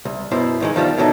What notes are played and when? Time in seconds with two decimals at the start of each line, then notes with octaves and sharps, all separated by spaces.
0.05 C2
0.31 F#2 B2 E4 C5
0.60 G#2 D#3 G#3
0.75 E2 D#3 F3 G3
0.97 B2 D3 F#3 A3 D#4